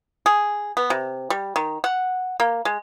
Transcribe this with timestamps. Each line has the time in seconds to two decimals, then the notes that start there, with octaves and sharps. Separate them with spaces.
0.26 G#4
0.77 B3
0.90 C3
1.30 G3
1.56 D#3
1.84 F#5
2.40 A#3
2.65 G#3